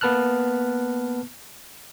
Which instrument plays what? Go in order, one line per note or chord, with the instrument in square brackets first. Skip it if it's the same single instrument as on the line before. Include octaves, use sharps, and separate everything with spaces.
[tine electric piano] A#3 B3 B4 A5 F6 F#6